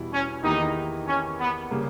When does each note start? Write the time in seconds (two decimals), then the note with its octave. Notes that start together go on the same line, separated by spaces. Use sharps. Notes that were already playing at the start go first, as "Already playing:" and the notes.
Already playing: E2 B2 G3 E4
0.12 C#4
0.44 E2 D#3 A#3 D#4 E4 G4
1.07 C#4
1.39 B3
1.71 C#3 G3 A#3